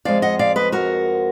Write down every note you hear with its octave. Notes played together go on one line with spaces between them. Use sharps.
F2 F3 G#3 D5 F5
D#5 F#5
D5 F5
B4 D#5
F#4 A#4